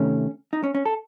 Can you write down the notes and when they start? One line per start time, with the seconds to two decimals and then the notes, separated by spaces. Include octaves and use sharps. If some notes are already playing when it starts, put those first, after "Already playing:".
Already playing: C3 D#3 A3 C#4
0.53 D#4
0.64 C#4
0.75 C#4
0.86 A4